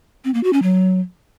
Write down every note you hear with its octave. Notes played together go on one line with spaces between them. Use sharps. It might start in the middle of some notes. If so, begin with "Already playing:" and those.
C4
A#3
F#4
C#4
F#3